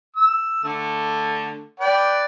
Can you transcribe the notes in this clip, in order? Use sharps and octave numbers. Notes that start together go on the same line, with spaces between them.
E6
D3 A3
B4 D5 G5